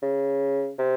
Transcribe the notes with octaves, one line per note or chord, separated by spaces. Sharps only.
C#3
C3